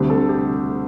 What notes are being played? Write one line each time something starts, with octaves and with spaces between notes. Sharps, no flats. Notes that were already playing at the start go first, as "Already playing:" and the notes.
Already playing: D2 C3 G3
A4
G4